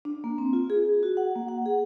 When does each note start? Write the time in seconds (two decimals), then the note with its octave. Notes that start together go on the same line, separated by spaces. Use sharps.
0.05 D4
0.24 A#3
0.38 C4
0.53 F4
0.70 G#4
1.03 F#4
1.17 F#5
1.35 A#3
1.48 F#5
1.66 G#4